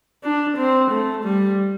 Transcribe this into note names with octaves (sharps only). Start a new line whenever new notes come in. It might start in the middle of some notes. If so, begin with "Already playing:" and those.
D4
C4
A3
G3